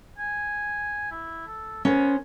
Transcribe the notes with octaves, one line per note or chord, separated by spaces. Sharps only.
G#5
E4
A4
B3 C#4 A#4 C5